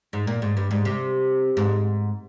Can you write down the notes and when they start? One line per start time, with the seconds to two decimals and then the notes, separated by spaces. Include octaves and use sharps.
0.13 G#2
0.27 A#2
0.42 G#2
0.57 G2
0.71 G#2
0.85 C3
1.57 G#2